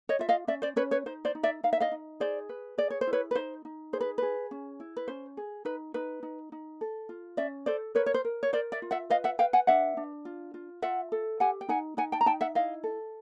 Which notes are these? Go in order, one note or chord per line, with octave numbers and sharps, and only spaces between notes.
C#5 D#5
F4 E5
D#5 F5
C#4 D5 E5
C5 D5
C#4 B4 C#5
B4 C#5
D#4 C5
C5 D5
D#4
D5 E5
D#4 F5
E5
D#5 F5
D#4
G#4 C5 D5
B4
G#4 D5
C#5
C5
E4
B4 C#5
B4
D#4 C5
D#4
G#4 C5
B4
G#4 B4
C#4
E4
B4
C#4 C5
G#4
D#4 B4
D#4 B4
D#4
D#4
A4
F4
C#4 D5 E5
A4 C5 D5
A#4 B4 C#5
C#5
C5
A#4
C#5
A#4 C5 D5
D5 E5
F4
E5 F#5
B4 D#5 F5
E5 F#5
B4 F5 G5
F#5 G#5
D4 E5 F#5
D4
F4
F4
F4 E5 F#5
A4
G4 F#5 G#5
G5
D#4 F#5 G#5
D#4 F#5 G#5
G5 A5
A#5
D#4 G5 A5
E5 F#5
E4 D#5 F5
A4